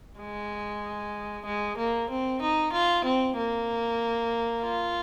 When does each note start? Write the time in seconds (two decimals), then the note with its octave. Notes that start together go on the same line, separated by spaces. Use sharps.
0.20 G#3
1.46 G#3
1.77 A#3
2.10 C4
2.42 D#4
2.73 F4
3.05 C4
3.37 A#3
4.63 F4